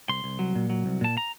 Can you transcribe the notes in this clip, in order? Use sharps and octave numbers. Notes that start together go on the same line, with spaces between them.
C2 C6
C2
F#3
A#2
F#3
C2
A#2 A5
A#5